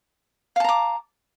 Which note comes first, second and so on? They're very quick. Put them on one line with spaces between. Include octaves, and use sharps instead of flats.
F5 A5 A#5 D6